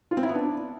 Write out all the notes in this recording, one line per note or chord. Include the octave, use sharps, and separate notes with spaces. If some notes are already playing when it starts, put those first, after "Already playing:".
F4
C4
E4
B3
D4